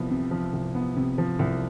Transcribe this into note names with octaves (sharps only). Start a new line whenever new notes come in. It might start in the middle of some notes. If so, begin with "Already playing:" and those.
Already playing: C2 F3 B3
C3
F3
C2
B3
C3
F3
C2